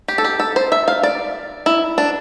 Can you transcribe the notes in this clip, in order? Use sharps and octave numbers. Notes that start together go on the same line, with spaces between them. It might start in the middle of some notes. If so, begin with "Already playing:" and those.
G4
A4
G4
A4
C5
E5
F5
D5
E4
D4